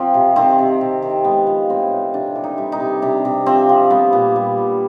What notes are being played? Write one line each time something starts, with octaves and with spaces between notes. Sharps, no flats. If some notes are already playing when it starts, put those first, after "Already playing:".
Already playing: F3 C4
C3
D#3 C4
C3
C3
D#3
G#3 B3
F3
A2 C4
A2
C3 D4
E3
D#4
G3
D#4
C3
C3 D4
C3
F3 C4
F3
G3 B3
A#2
G3
A#2